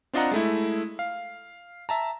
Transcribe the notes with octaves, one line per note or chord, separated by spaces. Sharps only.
C4 D4 F4 D#5 F#5 A#5
G#3 A3 E4
F5
E5 A5 A#5